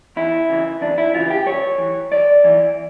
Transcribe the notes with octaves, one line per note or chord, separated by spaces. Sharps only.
E2 E4
C#3 E3
E2 D4
E4
C#3 E3 F4
G4
G2 C#5
E3
G2 D5
E3